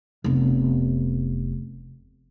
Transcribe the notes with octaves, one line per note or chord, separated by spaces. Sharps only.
F1 B3